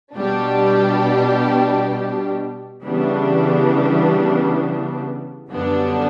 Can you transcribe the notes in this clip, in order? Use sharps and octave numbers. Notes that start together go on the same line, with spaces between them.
B2 G3 D4 G4
C#3 E3 G3 B3 D4
F#2 D3 G3 B3 D4